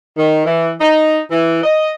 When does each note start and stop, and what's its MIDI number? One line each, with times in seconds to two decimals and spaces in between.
0.18 0.46 51
0.47 0.72 52
0.81 1.18 63
1.31 1.60 52
1.63 1.91 75